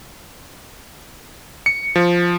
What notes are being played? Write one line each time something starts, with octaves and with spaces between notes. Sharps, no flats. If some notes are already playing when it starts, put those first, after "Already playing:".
C#7
F3